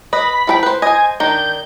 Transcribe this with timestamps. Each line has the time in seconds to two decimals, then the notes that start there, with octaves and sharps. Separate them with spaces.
0.13 B4 D#5 B5
0.47 F3 A4 G5
0.63 B4 C5
0.82 C5 D#5 G#5
1.20 D#3 D4 G6